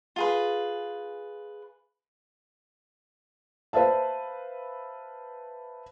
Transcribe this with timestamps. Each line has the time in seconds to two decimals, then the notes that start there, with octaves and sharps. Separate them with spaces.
0.16 F4 G#4 B4
3.73 B4 C5 E5 F5 A5